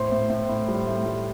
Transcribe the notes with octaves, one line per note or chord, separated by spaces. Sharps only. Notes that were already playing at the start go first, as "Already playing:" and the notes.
Already playing: A2 C5
A2
A2
A2
G3
A2
G3